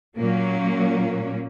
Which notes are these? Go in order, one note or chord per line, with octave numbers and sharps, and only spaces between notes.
A#2 F#3 A#3 C#4